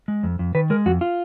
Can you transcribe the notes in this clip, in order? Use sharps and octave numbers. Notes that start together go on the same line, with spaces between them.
G#3
F2
F2
D#3 B4
G#3 A#4
F2 F#4
F4